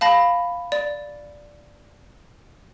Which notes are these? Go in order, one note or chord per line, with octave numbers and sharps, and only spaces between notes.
F5 A5 B5 A#6
D5